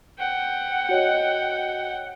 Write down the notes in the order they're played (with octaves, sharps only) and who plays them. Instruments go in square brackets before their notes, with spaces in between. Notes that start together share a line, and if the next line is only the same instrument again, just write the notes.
[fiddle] F#5 G5
[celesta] F#4 C#5 D#5